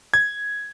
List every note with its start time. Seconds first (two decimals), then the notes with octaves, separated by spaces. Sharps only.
0.14 G#6